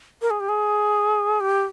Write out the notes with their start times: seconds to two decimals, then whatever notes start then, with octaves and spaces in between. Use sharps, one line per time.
0.22 A#4
0.30 G#4
0.40 G4
0.49 G#4
1.40 G4